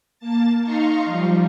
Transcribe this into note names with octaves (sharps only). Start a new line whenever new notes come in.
A#3 A5 A6
D#4 F5 A#5 C6 C#6
F3 G3